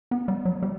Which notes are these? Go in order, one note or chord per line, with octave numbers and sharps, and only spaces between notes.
B3
G3
F#3
G3